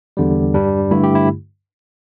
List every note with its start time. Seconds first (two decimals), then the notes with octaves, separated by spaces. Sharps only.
0.17 E2 D3 G3
0.54 G2 G3 D4
0.91 G2 D3 A3 E4
1.04 G4
1.15 E4